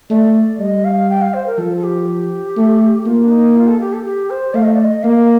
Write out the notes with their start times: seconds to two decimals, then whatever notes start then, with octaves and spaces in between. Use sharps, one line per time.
0.10 A3 D5
0.59 G3 D#5
0.85 F5
1.10 G5
1.22 F5
1.34 C5
1.46 A#4
1.58 F3 A4
1.77 A4
1.84 G4
2.56 A3
3.06 A#3 F4
3.24 D4
3.30 D#4
3.56 F4
3.68 A4
3.81 G4
3.93 A4
4.05 G4
4.30 C5
4.54 A3 F5
4.64 D#5
4.74 D5
4.84 D#5
5.03 A#3 F5